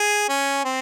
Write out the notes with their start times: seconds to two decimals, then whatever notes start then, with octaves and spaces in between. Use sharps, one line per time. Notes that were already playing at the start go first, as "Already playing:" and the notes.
Already playing: G#4
0.29 C#4
0.65 C4